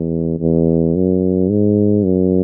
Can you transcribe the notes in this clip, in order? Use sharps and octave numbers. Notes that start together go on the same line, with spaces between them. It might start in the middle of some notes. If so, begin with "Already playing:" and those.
Already playing: E2
E2
F#2
G#2
F#2